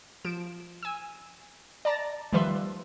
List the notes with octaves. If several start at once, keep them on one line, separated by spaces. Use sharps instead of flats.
F3 D7 E7
G#5 E6
D5 A5 A#5 A6 A#6
D#3 F3 G3 B4 E5 C6